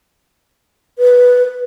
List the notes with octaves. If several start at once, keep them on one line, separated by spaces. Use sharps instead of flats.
B4